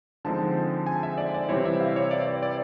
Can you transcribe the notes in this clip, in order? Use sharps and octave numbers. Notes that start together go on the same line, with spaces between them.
D3 F3 G#3 C4 D#4 A5
G#5
E5
D5
D5
C3 E3 G3 C4 E4 C#5
E5
F5
C#5
D5
D5
D5